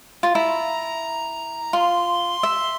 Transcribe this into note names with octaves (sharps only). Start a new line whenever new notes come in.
F4
E4 A#5
F4 C6
E5